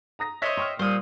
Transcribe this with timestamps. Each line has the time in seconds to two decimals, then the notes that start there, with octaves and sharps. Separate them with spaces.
0.19 A#5 D#6 A#6
0.42 C5 C#5 D#5 E5 A#6
0.57 G5 C6 C#6 F6
0.79 A#2 G3 C5 D#6